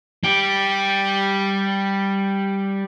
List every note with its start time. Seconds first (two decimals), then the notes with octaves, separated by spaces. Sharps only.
0.24 G3 G4